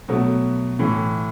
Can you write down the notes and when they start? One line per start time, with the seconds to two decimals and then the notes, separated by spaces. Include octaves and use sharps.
0.08 B2 F#3 A3
0.79 A2 E3